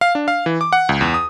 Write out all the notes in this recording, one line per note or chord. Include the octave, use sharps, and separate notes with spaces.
F5
D4
F5
E3
D6
F#5
C#2
E2
D#6